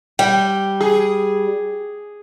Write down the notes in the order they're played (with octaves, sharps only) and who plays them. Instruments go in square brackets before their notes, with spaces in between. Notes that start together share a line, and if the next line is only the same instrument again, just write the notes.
[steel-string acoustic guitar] G3 [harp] G5
[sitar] G#4